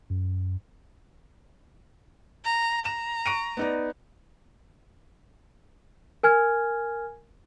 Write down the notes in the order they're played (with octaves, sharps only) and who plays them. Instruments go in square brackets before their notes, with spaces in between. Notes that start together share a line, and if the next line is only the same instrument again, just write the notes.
[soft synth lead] F#2
[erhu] A#5
[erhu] A#5 [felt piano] E7
[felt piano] C#6 D7 D#7
B3 D#4 D5
[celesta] A#4 G#5 F6 G#6